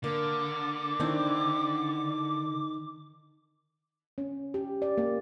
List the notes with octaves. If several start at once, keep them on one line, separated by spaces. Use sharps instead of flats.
D3 A#3 D6
D#3 C4 D4 E4
C#4
G4
D5
A#3